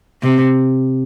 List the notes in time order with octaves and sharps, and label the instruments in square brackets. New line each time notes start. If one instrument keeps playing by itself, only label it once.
[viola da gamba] C3